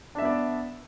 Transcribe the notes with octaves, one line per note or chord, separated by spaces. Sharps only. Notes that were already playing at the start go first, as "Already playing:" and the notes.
B3 D4 D5 E5